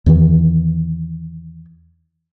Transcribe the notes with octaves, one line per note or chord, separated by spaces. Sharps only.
E2 D#3 E3